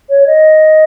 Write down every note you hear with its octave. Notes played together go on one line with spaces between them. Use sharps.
C#5
D#5